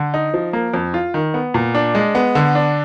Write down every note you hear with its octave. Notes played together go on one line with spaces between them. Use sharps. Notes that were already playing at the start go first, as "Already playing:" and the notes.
Already playing: D3
D#4
F3
A#3
F2
F4
D#3
B3
A#2
D4
G#3
B3
D3
D4